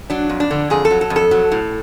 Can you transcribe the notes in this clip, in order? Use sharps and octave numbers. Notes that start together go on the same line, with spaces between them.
F#3 D4
F2
D4
D3
F2 G#4
A4
F#3
A4
F2
A4
F#3
A2